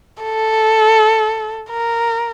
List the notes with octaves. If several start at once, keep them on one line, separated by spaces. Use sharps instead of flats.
A4
A#4